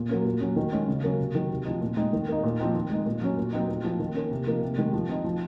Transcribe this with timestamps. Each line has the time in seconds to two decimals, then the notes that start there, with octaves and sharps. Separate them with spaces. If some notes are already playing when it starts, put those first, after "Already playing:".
Already playing: A#2
0.09 F#3 A#3 C#4
0.25 A#2
0.40 F#3 C#4
0.56 D#3
0.73 G#3 C#4
0.88 C#3
1.03 F#3 A#3 C#4
1.19 C3
1.35 D#3 F#3
1.51 C3
1.65 F3 C4 D#4
1.81 A#2
1.96 G#3 C4 D#4
2.13 D#3
2.28 A#3 D#4
2.43 A#2
2.59 F3 C4 D#4
2.74 D#3
2.90 G#3 D#4
3.06 A#2
3.22 F#3 C#4
3.37 A#2
3.53 F#3 C4 D#4
3.68 A#2
3.84 F3 C4
3.99 D#3
4.15 A#3 C#4
4.31 C3
4.47 F3 A#3 D#4
4.62 C3
4.78 D#3 G#3
4.93 F3
5.09 C4 D#4
5.24 F3